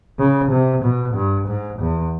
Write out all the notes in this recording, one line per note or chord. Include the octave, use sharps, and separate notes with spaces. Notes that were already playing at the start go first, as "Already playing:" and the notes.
C#3
C3
B2
G2
G#2
E2